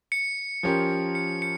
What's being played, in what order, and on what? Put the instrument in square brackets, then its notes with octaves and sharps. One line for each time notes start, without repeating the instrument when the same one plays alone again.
[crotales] C#7
[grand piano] F3 C#4 G4 A#4
[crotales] C#7
C#7